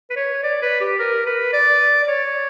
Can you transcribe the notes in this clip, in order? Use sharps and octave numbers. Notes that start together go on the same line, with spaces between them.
B4
C#5
D5
B4
G4
A#4
B4
D5
D5
C#5